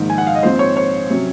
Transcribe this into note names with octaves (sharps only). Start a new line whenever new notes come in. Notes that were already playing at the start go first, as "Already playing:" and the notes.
Already playing: A#1 G#2 D#3
G#5
F#5
F5
D#5
A#1 G#2 F3 C4 C5
C#5
C#5
C3 F#3 C#4